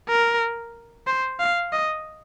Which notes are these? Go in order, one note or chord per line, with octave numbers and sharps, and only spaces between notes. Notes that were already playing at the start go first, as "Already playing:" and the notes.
A#4
C5
F5
D#5